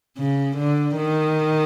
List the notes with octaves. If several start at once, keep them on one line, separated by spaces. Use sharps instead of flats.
C#3
D3
D#3